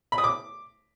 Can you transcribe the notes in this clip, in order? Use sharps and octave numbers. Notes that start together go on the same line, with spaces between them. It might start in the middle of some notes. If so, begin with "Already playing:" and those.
B5
D#6
D6